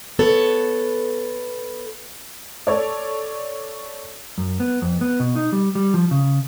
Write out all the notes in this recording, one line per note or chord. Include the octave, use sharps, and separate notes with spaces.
B3 A4 C#5
A4 C#5 D5
F#2
B3
F2
B3
B2
D#4
G3
G3
F3
C#3